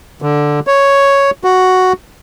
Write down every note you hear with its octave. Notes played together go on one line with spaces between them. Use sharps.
D3
C#5
F#4